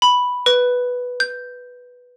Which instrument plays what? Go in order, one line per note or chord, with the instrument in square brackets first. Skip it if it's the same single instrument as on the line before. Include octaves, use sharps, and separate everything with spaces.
[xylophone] B5
B4
G6